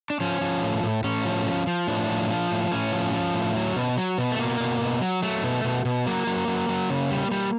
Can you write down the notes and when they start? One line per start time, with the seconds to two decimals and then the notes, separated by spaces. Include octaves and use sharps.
0.10 D4
0.20 F3 C#4
0.41 F3
0.63 A2
0.83 A2
1.04 A2 C#4
1.25 F3
1.46 F3
1.67 F3
1.87 A2 D4
2.09 F3
2.30 F3
2.51 A2
2.71 A2 C#4
2.92 F3
3.13 F3
3.34 A2
3.55 F#3
3.76 B2
3.97 F#3
4.18 B2
4.32 A3
4.39 B2 A#3
4.60 B2
4.81 B2
5.01 F#3
5.22 F#3 A3
5.43 B2
5.64 B2
5.85 B2
6.06 F#3 A#3
6.27 F#3
6.48 F#3
6.69 F#3
6.90 C#3
7.11 G3
7.31 G3